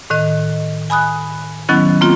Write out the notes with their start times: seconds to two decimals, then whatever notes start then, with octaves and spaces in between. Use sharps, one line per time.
0.10 A2 D#3 D#5
0.90 G#5 B5 D#6 F#6
1.69 D#3 F#3 B3 C#4 E4
2.01 A#3 C4 F4